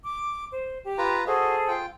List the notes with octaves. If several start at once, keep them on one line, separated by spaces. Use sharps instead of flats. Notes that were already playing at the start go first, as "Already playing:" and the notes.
D6
C5
G4
F4 B4 A#5
F#4 G#4 A4 C5 D#5
F4 G5